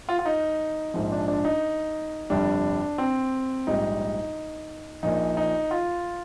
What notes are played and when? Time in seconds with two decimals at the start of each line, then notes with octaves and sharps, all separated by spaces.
0.09 F4
0.19 F4
0.26 D#4
0.94 A#1 G#2 F3
1.12 D4
1.28 D4
1.45 D#4
2.30 G1 F2 C3 G3 D4
2.98 C4
3.67 A#1 G#2 G3 D#4
5.03 A#1 A#2 F3 D#4
5.37 D#4
5.71 F4